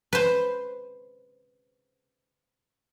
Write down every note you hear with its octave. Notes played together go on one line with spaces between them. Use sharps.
B4 C5